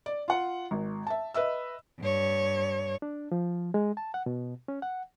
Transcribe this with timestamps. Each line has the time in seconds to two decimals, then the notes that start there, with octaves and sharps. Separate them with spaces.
0.06 D5
0.28 F4 F#5
0.71 G#1
1.07 E5 A5
1.34 B4 D#5 E5 E6
2.00 G2 C#5
3.02 D4
3.32 F3
3.74 G#3
3.97 A5
4.14 F#5
4.26 B2
4.68 C#4
4.82 F#5